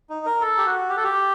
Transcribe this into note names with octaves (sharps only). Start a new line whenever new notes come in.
D#4
A#4
A4
G4
F#4
G4
A4
G4